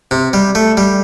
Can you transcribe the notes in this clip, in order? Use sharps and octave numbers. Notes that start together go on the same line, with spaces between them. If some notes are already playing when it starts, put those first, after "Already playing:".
C3
G3
A3
G3